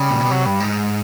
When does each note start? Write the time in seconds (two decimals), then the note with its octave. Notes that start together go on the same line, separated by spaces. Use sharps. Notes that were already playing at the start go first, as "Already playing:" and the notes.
Already playing: C#3 G3
0.11 A#2
0.21 B2
0.31 C3 F#3
0.46 G2 G3
0.60 G#2